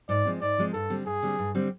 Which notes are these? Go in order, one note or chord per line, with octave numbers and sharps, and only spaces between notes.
G#2 D5
F3 G#3 C4
G#2 D5
F3 G#3 C4
G2 A4
D3 G3 C4
G2 G#4
D3 G3 C4
G2
D3 G3 C4